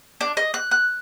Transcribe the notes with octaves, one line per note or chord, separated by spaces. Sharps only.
D4
D#5
F#6
F#6